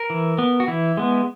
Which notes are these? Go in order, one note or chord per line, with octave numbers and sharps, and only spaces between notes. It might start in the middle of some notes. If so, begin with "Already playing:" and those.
Already playing: A#4
E3
B3
F#4
E3 E4
G#3 B3